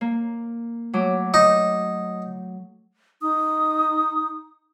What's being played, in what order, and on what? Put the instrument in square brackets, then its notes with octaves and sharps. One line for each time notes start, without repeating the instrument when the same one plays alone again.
[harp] A#3
F#3 A3 D6
[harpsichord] D#4
[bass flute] D#4 [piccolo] D#6